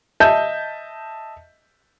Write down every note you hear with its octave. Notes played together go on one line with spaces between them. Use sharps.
D#5 E5 A5 G6